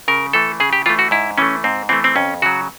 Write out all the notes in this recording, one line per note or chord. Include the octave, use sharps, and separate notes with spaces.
C#3 A#4
E3 A3 A4
C#3 G#4
G4
E3 A3 F4
F#4
G#2 E4
E3 A3 C#4
G#2 C4
E3 A3 C4
C4
F2 C#4
C#3 F#3 F#4